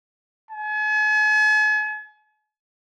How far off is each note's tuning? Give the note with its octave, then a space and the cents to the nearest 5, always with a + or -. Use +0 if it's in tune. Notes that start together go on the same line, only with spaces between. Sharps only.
G#5 +45